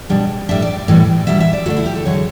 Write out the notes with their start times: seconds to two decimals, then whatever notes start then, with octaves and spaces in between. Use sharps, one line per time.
0.10 B2 G3 D4
0.49 A2 G3 D4 E5
0.62 D5
0.88 A2 E3 G3
1.27 B2 G3 D4 E5
1.40 E5
1.53 D5
1.66 D3 A3 D4 F#4
1.77 E4
1.86 G4
1.95 A4
2.05 E2 D3 F#3 C#5